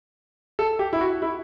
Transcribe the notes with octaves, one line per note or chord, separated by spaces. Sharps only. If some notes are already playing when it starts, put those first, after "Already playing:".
A4
G4
E4
F#4
E4